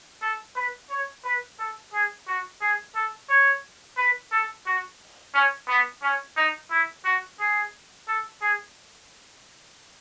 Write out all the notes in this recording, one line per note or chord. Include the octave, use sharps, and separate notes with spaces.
A4
B4
C#5
B4
A4
G#4
F#4
G#4
A4
C#5
B4
A4
F#4
C#4
B3
C#4
D#4
E4
F#4
G#4
A4
G#4